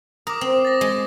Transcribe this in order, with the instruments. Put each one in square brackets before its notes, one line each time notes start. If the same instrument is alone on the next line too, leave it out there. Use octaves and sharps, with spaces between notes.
[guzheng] A#4 [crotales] D6 D#6
[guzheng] C4
[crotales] A6 A#6
[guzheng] G#3